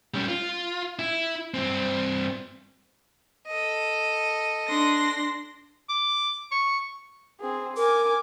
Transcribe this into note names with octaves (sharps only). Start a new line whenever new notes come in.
G3 C#4
F4
E4
G2 C4
A4 D#5
D4 C6 A#6
D6
C#6
C4 G#4
A#4 G#5 D6